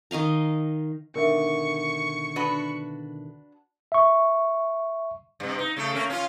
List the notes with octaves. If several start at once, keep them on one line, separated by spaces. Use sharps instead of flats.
D#3 D#5 F5 A#5
B2 D3 D#3 A#4 E5 C#6
D4 F#4 B4
E5 C#6
G2 C3
D#4
C#3 A3 A4
A3 A#3 C#4
C#4 F4